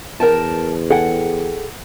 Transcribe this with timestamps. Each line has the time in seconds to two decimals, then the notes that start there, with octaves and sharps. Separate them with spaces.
0.20 E2 A#4 G5 A5
0.91 G#4 A4 F#5 G5